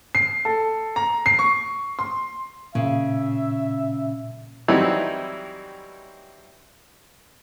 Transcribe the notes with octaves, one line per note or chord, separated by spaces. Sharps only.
C7
A4
A#5
C7
C#6
C6
A#2 C#3 E5
E3 F#3 G3 C4 D#4 E4